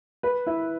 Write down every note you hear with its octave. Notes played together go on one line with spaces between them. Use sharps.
B4
E4